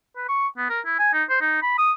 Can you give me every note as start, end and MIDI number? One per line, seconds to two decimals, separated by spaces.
0.17 0.27 71
0.29 0.47 85
0.58 0.69 59
0.70 0.80 70
0.85 0.98 64
0.99 1.12 80
1.13 1.24 63
1.30 1.37 72
1.41 1.62 63
1.62 1.78 83
1.78 1.92 87